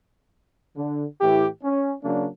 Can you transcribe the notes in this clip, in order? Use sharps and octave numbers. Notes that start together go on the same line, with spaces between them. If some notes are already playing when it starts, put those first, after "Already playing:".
D3
A2 E3 E4 G4
C#4
C#3 F#3 A#3 D4